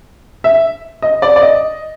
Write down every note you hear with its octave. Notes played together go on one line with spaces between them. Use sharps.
E5
D#5
D5
D5
D#5